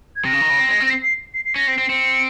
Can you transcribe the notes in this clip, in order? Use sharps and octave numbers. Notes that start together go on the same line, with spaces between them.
G#6
C3 A#6
C#3
D#3
C#3
C4
G#3
C4
C7
C7
C7
C7
C#4 A#6
C4
C7
C4
C4 C#7